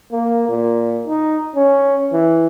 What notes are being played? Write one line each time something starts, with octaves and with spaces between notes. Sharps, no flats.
A#3
A#2
D#4
C#4
E3